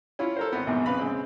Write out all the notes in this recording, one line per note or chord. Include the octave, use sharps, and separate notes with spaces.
C#4 E4 F4
A4 A#4 C5
G#1 B3
A#1 E2 G#2 B2
F2 C#3 B4 F5 B5
C#3 G#3 C4